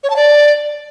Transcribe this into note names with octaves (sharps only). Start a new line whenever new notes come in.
C#5
A5
D5